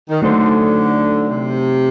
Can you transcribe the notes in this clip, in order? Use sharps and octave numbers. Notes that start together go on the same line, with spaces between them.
D#3
D3 F#3 A3 D#4 A4 C5
C3